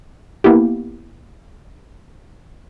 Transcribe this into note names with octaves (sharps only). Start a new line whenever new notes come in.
A#3 B3 E4 G4